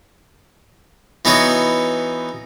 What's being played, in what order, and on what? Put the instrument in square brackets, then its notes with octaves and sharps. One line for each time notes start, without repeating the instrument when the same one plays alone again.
[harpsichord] E3 B3 D#4 F#4 C#5